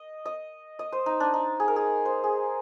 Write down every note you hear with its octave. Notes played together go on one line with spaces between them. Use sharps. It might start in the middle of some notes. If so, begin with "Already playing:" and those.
Already playing: D#5
D#5
D#5
C5
D#4
D4
D#4
G#4
A#4
G#4
C5
G#4